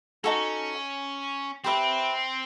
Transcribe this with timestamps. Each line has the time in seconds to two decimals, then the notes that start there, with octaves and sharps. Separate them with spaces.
0.24 C#4 D#4 F#4 A4
1.64 C4 G4 B4 E5